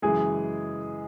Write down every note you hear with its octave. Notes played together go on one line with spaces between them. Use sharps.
F#2 C#3 E3 G#3 G#4